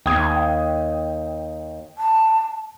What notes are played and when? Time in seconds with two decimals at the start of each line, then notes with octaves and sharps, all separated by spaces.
0.06 D#2 G5 D#6 G#6
1.98 A5